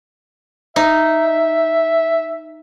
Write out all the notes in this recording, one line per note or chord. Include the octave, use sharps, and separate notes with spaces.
D#4 E5